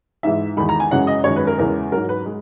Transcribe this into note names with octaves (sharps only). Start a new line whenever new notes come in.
G#2 E3 G#3 E5
E2 D#3 G#3 B5
A#5
G#5
F#2 C#3 E3 G#3 F#5
D#5
F#2 D#3 G#3 C#5
B4
A#4
E2 C#3 E3 G#3 A#4
G#2 F#3 A#4
B4
G#3